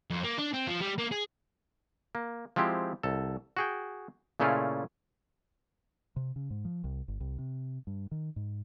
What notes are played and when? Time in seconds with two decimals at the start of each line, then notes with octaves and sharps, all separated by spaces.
0.11 F2
0.23 A#3
0.38 D4
0.53 C4
0.67 F3
0.80 G3
0.98 A#3
1.11 G#4
2.15 A#3
2.56 F3 G#3 C4 E4 G4
3.03 C2 A4
3.57 F#4 G#4 G5
4.40 A#2 C#3 A3 C#4 E4 F4
6.16 C3
6.36 C#3
6.50 G#2
6.65 F3
6.84 C2
7.08 G1
7.20 C2
7.38 C3
7.87 G2
8.11 D#3
8.36 G#2